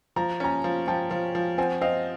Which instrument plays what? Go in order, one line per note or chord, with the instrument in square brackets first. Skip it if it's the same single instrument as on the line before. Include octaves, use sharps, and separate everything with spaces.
[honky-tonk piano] F3 [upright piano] A#5
[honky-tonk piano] C#4 [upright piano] G#5 A#5
[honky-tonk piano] F3
[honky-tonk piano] F3 [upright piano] G5 A5
[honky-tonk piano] F3
F3
[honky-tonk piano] C4 [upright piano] F#5 G#5
[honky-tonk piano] C4 [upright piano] D#5 F5